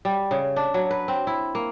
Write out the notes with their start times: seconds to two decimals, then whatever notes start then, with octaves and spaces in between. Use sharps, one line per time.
0.05 G3
0.31 C#3
0.56 D4
0.74 F#3
0.91 B4
1.08 C4
1.27 E4
1.55 A#3